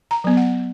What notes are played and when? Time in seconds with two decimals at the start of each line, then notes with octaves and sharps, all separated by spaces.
0.11 A#5
0.24 F#3 B3
0.37 F#5